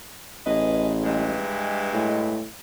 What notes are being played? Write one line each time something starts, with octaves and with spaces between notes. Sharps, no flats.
A1 G#4 B4 D#5
G2 E3 G#3
A2